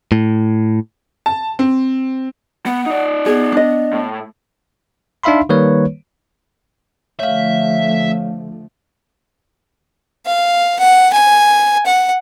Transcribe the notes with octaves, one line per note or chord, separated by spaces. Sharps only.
A2
A5
C4
B3 F#5
D#4 D5
B3 G#4
D4 D#5
A2
D4 D#4 E5 F5 B5 C6
D#3 G3 A#3 B4 C#5
D3 F3 A3 C#5 E5 F5
F5
F#5
G#5
F#5